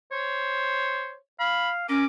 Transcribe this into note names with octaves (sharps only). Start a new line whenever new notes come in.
C5 C#5
F5 B5
C#4 A#4 D6